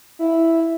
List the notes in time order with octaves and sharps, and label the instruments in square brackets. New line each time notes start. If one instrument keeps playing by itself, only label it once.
[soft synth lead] E4